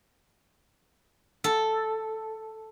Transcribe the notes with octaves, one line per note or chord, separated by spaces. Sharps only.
A4